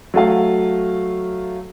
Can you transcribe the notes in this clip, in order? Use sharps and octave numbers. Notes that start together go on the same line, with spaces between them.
F#3 A3 F5